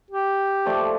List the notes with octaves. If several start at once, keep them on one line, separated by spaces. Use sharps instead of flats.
G4
F3 A3 D5